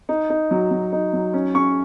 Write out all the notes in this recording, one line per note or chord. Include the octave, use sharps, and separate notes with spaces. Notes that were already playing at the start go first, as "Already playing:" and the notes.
D#4
D#4
F#3
F#3
D#4
F#3
C#4
C#4 C#6